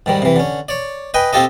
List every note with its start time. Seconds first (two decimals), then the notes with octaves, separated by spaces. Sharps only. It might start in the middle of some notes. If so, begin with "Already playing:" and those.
0.06 G#2 D#3 G3
0.22 C3 E3
0.36 D3 C#4
0.69 C#5 D5
1.14 B4 D#5 G5 G#5
1.33 C4 F4 G4 A4 D#5